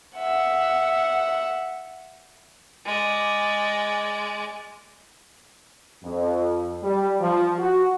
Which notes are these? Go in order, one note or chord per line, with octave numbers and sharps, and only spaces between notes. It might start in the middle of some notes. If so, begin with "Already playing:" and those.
E5 F#5
G#3 D5
F2
G3
F3
F#4